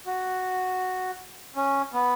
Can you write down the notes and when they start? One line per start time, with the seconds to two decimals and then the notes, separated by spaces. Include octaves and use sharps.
0.06 F#4
1.56 C#4
1.93 B3